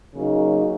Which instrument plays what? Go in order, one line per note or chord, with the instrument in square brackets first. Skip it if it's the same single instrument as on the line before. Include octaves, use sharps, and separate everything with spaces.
[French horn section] C#3 F#3 A#3 D#4